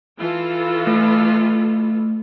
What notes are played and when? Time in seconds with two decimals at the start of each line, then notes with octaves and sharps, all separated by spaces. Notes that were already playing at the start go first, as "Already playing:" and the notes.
0.20 E3 F4 A4
0.87 A3